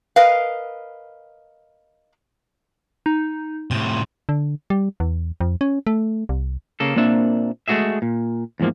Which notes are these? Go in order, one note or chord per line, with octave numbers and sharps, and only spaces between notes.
A#4 B4 D#5 F5
D#4
A2 C3 C6
D3
G3
E2
F2
C#4
A3
C2
C#3 A#3 A4
A#2 A#3 C4 D4 E5
G#3 A3 C#4 F#4 G#4 E5
A#2
E2 G#2 F3 A#3